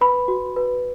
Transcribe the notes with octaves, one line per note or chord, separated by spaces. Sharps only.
B4 B5
F#4
B4